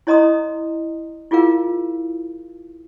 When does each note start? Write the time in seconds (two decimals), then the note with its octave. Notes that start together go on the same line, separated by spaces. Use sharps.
0.07 E4 C#5 D#5 A#5 C6 D#6
1.31 E4 F4 G#4 A#4 F5